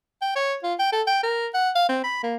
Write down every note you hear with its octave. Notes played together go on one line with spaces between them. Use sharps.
G5
C#5
F4
G5
A4
G5
A#4
F#5
F5
C4
B5
A#3